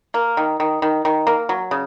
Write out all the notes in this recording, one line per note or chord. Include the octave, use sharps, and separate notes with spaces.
A#3
D#3
D#3
D#3
D#3
A#3
F#3
C#3